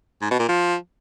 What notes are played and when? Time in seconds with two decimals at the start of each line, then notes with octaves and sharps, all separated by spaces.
0.22 G#2
0.31 B2
0.40 A#2
0.49 F3